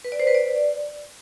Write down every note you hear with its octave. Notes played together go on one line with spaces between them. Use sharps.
B4
D5
C5
B4
D5